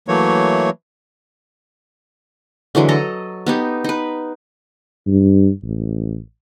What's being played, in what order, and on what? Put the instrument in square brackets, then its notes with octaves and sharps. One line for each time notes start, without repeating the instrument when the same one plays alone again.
[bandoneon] E3 F#3 A3 A#3 C#5
[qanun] D3 E3 F#3 G#3
A4 D#5 A#5
B3 D#4 G4
D#4 B4
[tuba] G2
A1